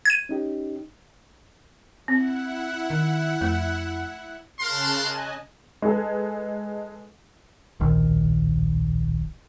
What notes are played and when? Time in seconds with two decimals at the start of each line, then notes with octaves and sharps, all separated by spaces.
0.05 G#6 D#7
0.29 C#4 D#4 G4
2.08 C4 E4 F#5
2.90 D#3
3.41 F2 A3
4.60 C#3 A#4 F5 A5 C6 F#6
5.00 D#5 G#5
5.82 G#3 D#4 G#4 A4 B4
7.80 D1 A#1 D#3